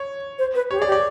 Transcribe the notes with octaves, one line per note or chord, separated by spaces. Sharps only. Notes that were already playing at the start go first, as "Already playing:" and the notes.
Already playing: C#5
C5
B4
G4 C#5
G#4 D5
G4
D5